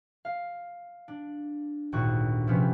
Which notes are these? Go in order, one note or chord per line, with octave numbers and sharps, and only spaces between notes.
F5
D4
G#1 D2 A#2 F#4 C#6 F#6
C3 F3 G3 C4 C#4 B4